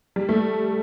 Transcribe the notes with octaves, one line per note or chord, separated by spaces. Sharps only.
G3
A3